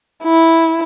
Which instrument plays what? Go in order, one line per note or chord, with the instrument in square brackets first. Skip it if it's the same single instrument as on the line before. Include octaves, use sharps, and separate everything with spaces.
[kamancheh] E4